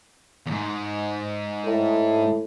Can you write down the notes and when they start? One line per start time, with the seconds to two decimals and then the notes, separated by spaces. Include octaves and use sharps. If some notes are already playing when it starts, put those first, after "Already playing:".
0.46 E2 G#2
1.65 A2